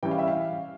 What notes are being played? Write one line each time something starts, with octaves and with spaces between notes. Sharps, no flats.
E3 G3 C#4 G5
F5
E5
F5